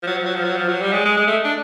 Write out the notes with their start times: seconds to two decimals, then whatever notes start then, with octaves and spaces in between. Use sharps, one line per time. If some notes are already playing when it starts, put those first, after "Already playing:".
0.03 F3
0.07 F#3
0.17 F3
0.26 F#3
0.35 F3
0.44 F#3
0.56 F3
0.68 F#3
0.81 G3
0.93 G#3
1.05 G#3
1.17 G#3
1.27 A3
1.45 D4